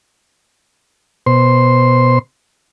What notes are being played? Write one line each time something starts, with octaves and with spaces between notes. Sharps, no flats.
B2 C5 C6